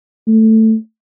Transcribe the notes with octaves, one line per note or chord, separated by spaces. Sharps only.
A3